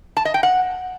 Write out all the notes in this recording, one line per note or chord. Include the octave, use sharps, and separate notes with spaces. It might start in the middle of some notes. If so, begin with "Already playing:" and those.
A5
D#5
G5
F#5